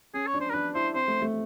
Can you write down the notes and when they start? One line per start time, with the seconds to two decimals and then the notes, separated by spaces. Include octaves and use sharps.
0.14 C#4 G#4
0.27 C#5
0.34 D4
0.41 C5
0.50 A#4
0.54 D4 B4
0.75 E4 C5
0.95 C4 C5
1.08 A3
1.22 A3